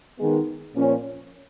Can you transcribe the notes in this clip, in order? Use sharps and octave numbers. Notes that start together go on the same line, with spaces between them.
D#3 G#3 B3
A#2 F3 A#3 C#4